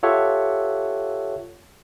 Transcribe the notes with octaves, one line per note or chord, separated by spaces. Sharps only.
F4 G4 A4 C#5 E5 F#5